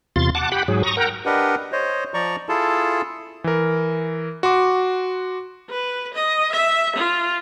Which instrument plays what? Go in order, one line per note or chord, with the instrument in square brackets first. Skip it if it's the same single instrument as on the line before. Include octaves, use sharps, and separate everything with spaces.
[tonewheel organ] E2 C3 F4 C6 A6
F#5 A5 D6
G4 F#5 G5 B5
G#2 F#3 G#4
A#5 C#6 D#6
A#4 F#5 G5 A#5
[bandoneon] D4 G4 A#4 B4 D#5 F#5
C5 C#5 D#5
F3 D5 A#5 C#6
E4 F4 G#4 A4 A5
[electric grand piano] E3 A#4
F#4 C6 D6
[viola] B4
D#5
E5
F4